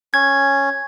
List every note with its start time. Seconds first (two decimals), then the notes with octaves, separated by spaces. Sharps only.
0.14 C#4 G#6